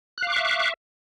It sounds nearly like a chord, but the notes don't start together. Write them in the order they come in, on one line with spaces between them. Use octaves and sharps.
F#6 F5 D6 C#6 E5